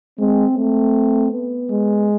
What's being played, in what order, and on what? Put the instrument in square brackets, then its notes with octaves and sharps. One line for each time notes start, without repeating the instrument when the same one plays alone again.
[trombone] G#3 [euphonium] C4
[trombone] A3 [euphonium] C4
[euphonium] B3
[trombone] G#3